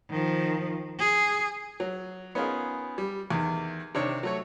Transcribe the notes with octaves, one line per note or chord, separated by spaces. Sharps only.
D#3 F3
G#4
F#3
B3 C#4 D#4 F4 G#4 A#4
G3
E2 D#3
C3 D#3 D4 C#5
F#3 A3 C#5